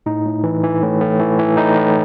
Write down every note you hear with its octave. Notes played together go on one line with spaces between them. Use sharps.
A2 D#4
A2
E3
E3
A2
A2
E3
E3
A2 D#4
A2